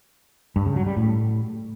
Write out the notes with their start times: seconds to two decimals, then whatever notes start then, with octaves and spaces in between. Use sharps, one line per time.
0.56 G2
0.66 C#3
0.76 F#3
0.86 G3
0.97 A2